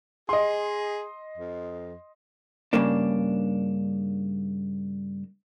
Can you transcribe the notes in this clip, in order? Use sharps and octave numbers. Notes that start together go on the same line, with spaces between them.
G#4 D#5 C6
F2
G2 C#3 A#3 D4